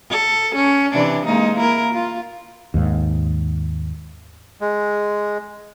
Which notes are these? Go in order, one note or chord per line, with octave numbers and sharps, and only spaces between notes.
A4
C#4
C3 E3 D4
G#3 A#3 D#4
A#3 E4 A#4
F4
D#2 G#2
G#3